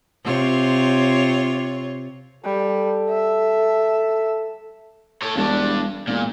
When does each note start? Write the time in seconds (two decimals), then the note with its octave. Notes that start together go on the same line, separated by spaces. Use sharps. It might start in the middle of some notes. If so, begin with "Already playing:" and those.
0.24 C3 F4 C#5
2.44 G3 A4
3.08 E5
5.22 A4 C#5
5.36 E1 G2 D4
6.07 E1 A#2